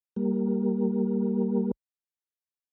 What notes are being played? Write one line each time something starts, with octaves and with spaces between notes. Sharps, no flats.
G3 A#3